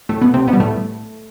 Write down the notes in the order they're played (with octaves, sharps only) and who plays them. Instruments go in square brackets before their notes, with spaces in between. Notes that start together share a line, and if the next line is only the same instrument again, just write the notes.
[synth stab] A2 A3
B2 B3
C3 C4
B2 B3
G3
A2 A3